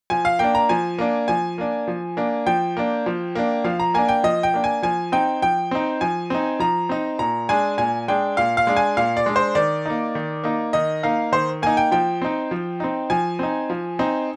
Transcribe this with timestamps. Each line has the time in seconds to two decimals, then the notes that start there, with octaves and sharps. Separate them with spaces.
0.10 F3 G#5
0.25 F5
0.39 A#3 D4 G5
0.55 A#5
0.69 F3 G#5
0.98 A#3 D4
1.28 F3 G#5
1.58 A#3 D4
1.88 F3
2.17 A#3 D4
2.46 F3 G5
2.77 A#3 D4
3.06 F3
3.35 A#3 D4
3.64 F3 F5
3.80 A#5
3.94 A#3 D4 G#5
4.09 G5
4.24 F3 D#5
4.43 G5
4.54 A#3 D4
4.64 G#5
4.83 F3 G#5
5.12 C4 D#4 G5
5.42 F3 G5
5.71 C4 D#4
6.01 F3 G#5
6.30 C4 D#4
6.60 F3 A#5
6.89 C4 D#4
7.19 A#2 A#5
7.49 G#3 D4 G#5
7.78 A#2 G#5
8.08 G#3 D4 G5
8.37 A#2 F5
8.57 F5
8.67 G#3 D4
8.77 G#5
8.97 A#2 F5
9.17 D5
9.26 G#3 D4
9.36 C5
9.55 D#3 D5
9.86 A#3 D#4
10.15 D#3
10.44 A#3 D#4
10.73 D#3 D#5
11.03 A#3 D#4 F5
11.32 D#3 C5
11.62 A#3 D#4 G#5
11.77 G5
11.92 F3 G5
12.22 C4 D#4
12.51 F3
12.80 C4 D#4
13.10 F3 G#5
13.39 C4 D#4
13.70 F3
13.99 C4 D#4